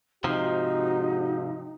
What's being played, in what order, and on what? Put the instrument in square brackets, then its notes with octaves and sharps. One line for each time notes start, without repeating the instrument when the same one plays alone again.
[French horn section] G#2 F#4 [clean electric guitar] C3 F3 [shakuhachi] D#4